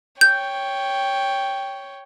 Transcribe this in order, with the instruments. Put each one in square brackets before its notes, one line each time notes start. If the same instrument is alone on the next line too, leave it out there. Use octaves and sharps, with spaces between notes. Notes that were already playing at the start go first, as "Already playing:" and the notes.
[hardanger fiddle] C#5 G5 [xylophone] G6